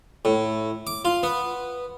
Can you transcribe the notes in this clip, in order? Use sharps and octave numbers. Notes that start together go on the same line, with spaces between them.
A2
D6
F4
B3